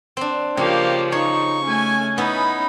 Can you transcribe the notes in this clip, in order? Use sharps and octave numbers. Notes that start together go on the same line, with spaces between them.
C4 D4
C#3 F3 A#3 G4 G5
D#4 C#5 C#6
A3 C#4 G#5
B3 D#4 E4 B5